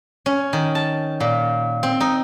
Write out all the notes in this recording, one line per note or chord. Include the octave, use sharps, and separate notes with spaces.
C#4
D#3
A5
A#2
C4
D#4